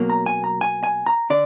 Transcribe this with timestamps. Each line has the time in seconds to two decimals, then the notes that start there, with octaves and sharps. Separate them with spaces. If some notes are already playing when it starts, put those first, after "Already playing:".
Already playing: B1 B2 F#3 A#3
0.10 A#5
0.26 G#5
0.44 A#5
0.61 G#5
0.84 G#5
1.06 A#5
1.30 D3 D5